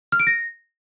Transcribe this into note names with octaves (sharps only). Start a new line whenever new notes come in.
F6
D7
A#6